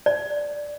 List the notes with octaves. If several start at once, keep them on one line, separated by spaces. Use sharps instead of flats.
D5